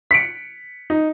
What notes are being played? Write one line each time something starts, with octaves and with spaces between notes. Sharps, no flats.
B6 C#7 D7
D#4